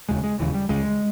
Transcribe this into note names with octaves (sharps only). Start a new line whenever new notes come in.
E1 D#2 C#3 G#3
G#3
E1 D#2 C#3 E3
G3
C#2 C#3 G#3